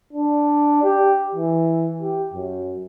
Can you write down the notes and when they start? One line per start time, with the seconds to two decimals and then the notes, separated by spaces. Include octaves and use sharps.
0.13 D4
0.83 G4
1.35 E3
2.02 G4
2.34 F#2